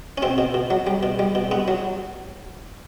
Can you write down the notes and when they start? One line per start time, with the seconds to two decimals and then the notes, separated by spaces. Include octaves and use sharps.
0.18 C#4
0.22 B2 C4
0.38 B2
0.54 B2
0.71 F#3
0.87 G3
1.03 B2
1.19 G3
1.35 B2
1.51 G2 B3
1.68 F#3